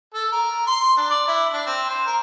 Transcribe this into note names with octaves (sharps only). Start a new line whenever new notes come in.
A4
A#4
C6
D4
D5
E4
D4
C4
C5
A#4